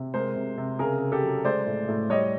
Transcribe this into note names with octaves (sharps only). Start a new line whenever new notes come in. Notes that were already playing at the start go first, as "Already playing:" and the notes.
Already playing: C3
G#3 A#4 C5
C3
C3
C#3 G#4 A#4
C#3
G4 A4
F#3
G#3 C5 D5
A2
A2
G3 C#5 D#5